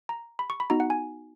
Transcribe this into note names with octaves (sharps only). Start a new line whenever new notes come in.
A#5
B5
C#6
B5
B3 D#4 F#4 A#5
F#5
G#5